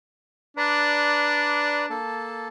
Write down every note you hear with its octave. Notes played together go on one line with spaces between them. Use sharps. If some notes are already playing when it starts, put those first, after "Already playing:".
D4 B4 D5 A#5
A#3 A4 A5